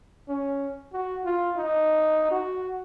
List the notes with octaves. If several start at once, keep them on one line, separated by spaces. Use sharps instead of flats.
C#4
F#4
F4
D#4
F#4